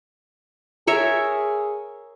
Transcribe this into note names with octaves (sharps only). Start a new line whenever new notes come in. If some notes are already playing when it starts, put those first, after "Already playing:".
G#4 A#4 C#5 E5